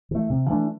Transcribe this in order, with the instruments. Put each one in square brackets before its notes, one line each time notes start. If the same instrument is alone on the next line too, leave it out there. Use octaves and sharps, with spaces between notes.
[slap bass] E3 A3
C3
E3 A3 D4